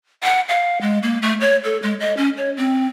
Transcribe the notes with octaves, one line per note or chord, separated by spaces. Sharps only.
F#5
F5
G#3
A#3
A3
C#5
A4
G#3
D#5
C#4
C#5
C4